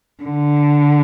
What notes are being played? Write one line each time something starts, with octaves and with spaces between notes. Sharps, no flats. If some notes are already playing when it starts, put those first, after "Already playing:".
D3